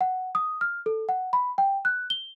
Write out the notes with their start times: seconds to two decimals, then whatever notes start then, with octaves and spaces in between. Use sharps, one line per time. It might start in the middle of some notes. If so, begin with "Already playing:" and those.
0.01 F#5
0.35 D#6
0.61 F6
0.86 A4
1.09 F#5
1.33 B5
1.58 G5
1.85 F#6
2.10 G7